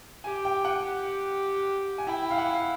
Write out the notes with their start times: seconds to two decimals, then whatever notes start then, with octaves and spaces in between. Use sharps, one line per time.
0.24 G4 G#5
0.45 G5
0.65 F#5
0.85 G4
1.98 G#5
2.07 E4 G5
2.23 G5
2.31 F5
2.38 F#5
2.54 F5